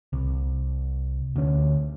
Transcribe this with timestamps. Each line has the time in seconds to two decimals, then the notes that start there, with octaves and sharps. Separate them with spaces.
0.13 C2
1.36 D2 C#4